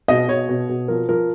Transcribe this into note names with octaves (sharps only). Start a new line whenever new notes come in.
B2 D#5
B2 C#5
B2
B2
F3 A#4
F3 A#4